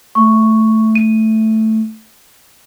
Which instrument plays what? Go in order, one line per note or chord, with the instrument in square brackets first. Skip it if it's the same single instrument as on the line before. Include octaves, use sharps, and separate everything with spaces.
[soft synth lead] A3 [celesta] C#6
[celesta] D#7